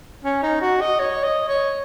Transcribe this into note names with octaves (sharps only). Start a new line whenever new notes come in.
C#4
D#4
F#4
D#5
C#5
D#5
C#5